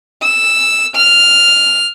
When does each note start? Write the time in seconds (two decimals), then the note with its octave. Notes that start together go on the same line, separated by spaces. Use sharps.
0.23 E6
0.96 F6